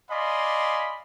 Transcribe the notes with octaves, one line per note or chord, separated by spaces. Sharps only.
D5 D#5 F5 G#5 B5 C6